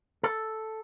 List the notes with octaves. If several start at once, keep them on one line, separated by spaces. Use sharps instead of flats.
A4